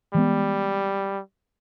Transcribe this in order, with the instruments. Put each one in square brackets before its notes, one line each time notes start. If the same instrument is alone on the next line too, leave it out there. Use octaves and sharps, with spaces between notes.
[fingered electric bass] E3 G#3 B3 [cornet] G3